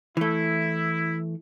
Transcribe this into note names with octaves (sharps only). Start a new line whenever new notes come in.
E3 A3 E4